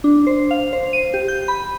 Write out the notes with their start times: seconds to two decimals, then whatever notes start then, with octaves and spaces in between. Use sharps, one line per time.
0.04 D4
0.27 C5
0.51 F5
0.73 C5
0.93 D#7
1.14 G4
1.28 G6
1.48 B5